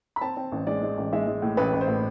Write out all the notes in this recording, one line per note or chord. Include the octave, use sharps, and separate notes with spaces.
B5
C4 A5
C4
A1
G#3 D5
G#3
A1
G#3 E5
G#3
A2
A1 B4
A1
C5
A2